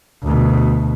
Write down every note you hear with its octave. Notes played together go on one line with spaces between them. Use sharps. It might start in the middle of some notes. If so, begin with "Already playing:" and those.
D2 B2